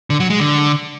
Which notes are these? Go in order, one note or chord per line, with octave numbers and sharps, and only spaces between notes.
D3
F#3
G#3
D3